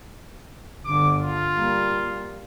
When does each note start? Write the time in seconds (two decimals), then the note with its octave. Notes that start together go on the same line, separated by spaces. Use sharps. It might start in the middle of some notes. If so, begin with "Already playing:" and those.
0.85 G1 D3 D6
1.20 F4
1.57 G3 A#3